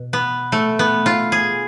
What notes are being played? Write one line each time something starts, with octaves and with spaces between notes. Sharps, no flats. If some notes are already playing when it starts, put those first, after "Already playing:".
Already playing: B2
B3
A3
B3
F4
G#4